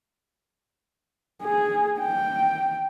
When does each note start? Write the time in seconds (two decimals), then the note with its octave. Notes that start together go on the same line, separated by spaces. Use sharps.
1.43 G#4
2.01 G5